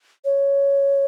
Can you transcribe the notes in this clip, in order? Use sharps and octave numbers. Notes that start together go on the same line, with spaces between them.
C#5